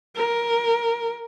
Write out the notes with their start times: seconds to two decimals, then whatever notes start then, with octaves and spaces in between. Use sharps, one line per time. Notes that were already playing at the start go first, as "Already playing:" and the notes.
0.16 A#4